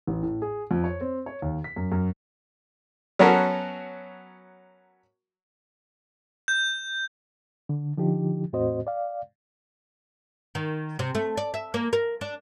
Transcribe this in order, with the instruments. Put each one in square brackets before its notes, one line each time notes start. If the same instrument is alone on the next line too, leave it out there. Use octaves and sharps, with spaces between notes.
[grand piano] A1
A2
G#4
F2
C#5
C4
C#5
D#2
B6
F#2
F#2
[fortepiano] F#3 B3 C#4 F#4 A4 A#4
[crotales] G6
[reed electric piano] D3
D3 F3 D#4 G4
E2 A2 C4 F#4 C5 D#5
D5 F5
[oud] D#3
C3
A3
D5
E5
A#3
A#4
D4